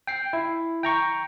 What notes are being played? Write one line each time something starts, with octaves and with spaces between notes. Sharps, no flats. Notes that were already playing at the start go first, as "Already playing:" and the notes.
G5 C7
E4
G5 A#5 C#6